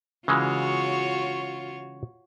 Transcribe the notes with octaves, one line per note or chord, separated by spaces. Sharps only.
C#3 E3 G#3 F4 F#4 C#5